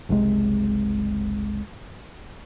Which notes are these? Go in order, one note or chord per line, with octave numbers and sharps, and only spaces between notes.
F#1 C2 C3 G#3